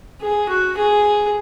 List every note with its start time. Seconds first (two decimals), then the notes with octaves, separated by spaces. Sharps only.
0.21 G#4
0.49 F#4
0.77 G#4